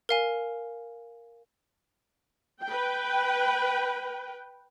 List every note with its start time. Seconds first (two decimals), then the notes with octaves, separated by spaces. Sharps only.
0.09 A#4 F5 G#5
2.64 B4 G5